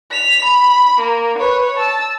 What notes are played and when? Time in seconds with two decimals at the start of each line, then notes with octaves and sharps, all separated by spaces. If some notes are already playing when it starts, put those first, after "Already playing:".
0.11 B6 F7
0.45 B5
1.00 A#3
1.39 B4 C#5
1.76 A5 E6